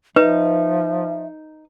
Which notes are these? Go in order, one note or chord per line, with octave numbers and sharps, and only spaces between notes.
F3 D#4 B4 E5